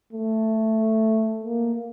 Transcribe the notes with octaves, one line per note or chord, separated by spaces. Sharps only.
A3
A#3